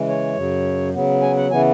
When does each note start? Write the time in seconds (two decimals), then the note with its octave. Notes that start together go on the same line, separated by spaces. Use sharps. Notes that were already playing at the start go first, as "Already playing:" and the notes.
Already playing: C#3 E3 G#3
0.08 C#5
0.37 F#2 C#3 F#3
0.94 C#3 F#3 B3
1.22 G#5
1.37 F#5
1.51 C#3 E3 B3 G#5